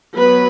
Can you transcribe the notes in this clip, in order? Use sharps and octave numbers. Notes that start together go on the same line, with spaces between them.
F#3 B3 B4